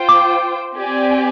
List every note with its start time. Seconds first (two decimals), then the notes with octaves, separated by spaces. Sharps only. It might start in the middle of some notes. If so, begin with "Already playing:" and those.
Already playing: F4 C5 G5
0.09 D6
0.75 C4 G4 D5 G#5